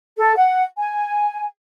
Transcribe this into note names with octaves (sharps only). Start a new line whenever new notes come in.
A4
F#5
G#5